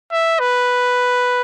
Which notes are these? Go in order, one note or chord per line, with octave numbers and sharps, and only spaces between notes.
E5
B4